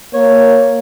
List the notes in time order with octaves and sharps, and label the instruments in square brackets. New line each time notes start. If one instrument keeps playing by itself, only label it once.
[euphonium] A#3 [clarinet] C#5